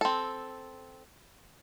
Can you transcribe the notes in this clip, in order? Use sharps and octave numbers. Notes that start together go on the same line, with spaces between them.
C4 A4